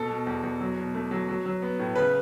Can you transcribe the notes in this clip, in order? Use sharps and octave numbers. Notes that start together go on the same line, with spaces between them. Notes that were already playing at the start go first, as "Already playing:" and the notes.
Already playing: B2 A4
B2
E2
E2
F#3
B2
A3
F#3
F#3
F#3
B3
A2
C#3 B4